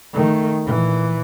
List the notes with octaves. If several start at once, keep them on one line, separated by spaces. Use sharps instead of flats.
D#3 A3
A#2 E3